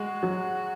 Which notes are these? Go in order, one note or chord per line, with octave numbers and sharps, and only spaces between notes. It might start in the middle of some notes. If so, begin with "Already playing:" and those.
Already playing: G#3 F#4
F#3